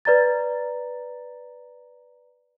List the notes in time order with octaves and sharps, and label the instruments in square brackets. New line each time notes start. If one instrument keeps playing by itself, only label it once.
[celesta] B4 D5 A#5 A6